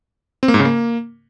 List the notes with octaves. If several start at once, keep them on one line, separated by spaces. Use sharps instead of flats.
C4
A#3
G#2
C#3
A#3